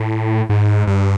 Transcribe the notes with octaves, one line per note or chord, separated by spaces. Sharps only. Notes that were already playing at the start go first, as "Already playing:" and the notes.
Already playing: A2
G#2
G2